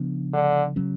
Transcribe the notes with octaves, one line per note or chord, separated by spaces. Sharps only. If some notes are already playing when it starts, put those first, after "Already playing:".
Already playing: C#3 F3 B3 D4
D3
C#3 F#3 C#4